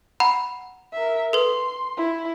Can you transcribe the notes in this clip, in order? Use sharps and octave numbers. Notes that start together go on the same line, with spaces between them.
F#5 A#5 B5
A#4 E5
A4 B4 C6
E4